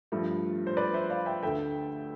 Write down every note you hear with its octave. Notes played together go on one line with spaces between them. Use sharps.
G2 F3 A3
C5
B4 D5
C5 E5
D5 F5
E5 G5
D2 D3 A3 E5 G5